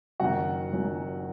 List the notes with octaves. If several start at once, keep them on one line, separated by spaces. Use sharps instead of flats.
F#1 F#2 D#3 F#3 F#4 F#5
F#1 F#2 D#3 F#3